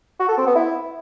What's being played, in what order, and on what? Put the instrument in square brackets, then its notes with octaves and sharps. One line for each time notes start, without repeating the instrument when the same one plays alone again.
[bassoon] F#4
A4
C4
B3
E4